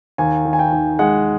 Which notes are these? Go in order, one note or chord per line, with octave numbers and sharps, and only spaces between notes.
D#2 G#5
D#3
G#5
G5
D#2
G#3 F#5